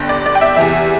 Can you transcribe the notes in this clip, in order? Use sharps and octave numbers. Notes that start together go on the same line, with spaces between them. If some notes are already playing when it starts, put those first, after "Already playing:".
Already playing: G1 G2 D3 G5
D5
D5
G5
E5
E2 C3 E3 E5